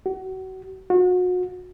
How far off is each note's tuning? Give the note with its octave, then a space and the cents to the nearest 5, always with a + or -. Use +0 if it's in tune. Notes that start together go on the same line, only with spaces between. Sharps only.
F#4 +30
F#4 -35